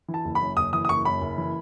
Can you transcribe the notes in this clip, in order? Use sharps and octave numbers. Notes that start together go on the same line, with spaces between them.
E3
A5
F#1
B5
F#2
F#1 D#6
E3 D#6
D#6
F#1 C#6
F#2 B5
F#1
E3